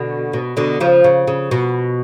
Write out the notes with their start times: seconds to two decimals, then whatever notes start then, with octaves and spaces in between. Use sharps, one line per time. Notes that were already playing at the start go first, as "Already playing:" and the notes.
Already playing: B2 D3
0.33 B2
0.57 B2 D3
0.80 C#3 F3
1.04 C#3
1.27 C#3
1.51 B2